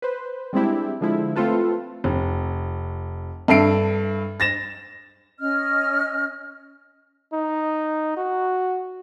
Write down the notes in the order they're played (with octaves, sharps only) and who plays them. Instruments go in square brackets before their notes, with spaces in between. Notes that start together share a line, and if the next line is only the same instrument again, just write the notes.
[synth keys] B4 C5
G3 G#3 C4 D4 E4 G4
D3 F3 G#3 E4
A3 C4 F4 A4 B4
[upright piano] F1
G2 A4 E5 C7 D7
A6 A#6 E7
[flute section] C#4 D#5 F6
[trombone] D#4
F#4